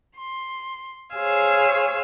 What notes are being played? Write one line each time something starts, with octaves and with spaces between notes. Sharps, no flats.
C6
G#4 C5 C#5 F5 G#5 E6